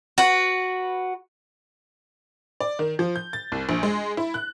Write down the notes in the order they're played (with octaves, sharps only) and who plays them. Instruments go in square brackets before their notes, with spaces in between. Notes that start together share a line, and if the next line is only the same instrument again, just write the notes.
[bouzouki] F#4 B4
[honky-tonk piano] D5
D#3
F3
G6
A6
C2
A#1
G#3
E4
F#6